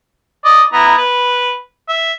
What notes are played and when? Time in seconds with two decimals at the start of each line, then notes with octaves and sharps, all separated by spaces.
0.45 D5 D#5
0.73 B3 E4 A#5
0.98 B4
1.89 E5